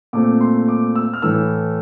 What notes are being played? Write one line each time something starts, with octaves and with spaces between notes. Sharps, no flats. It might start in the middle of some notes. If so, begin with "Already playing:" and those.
A#2 A3 C4 D6
C6
D6
E6
F6
A2 E3 A3 E6